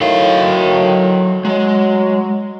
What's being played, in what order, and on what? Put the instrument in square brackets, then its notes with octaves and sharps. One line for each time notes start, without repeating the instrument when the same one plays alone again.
[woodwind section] A2 D#3 [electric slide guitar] F#3 F#4 F5
[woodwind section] F#3 [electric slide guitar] G#3